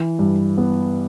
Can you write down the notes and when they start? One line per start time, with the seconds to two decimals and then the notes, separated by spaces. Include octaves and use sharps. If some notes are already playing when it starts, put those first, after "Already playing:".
Already playing: E3
0.19 G2
0.57 B3